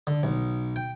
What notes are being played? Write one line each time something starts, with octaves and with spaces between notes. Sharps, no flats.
D3
B1
G5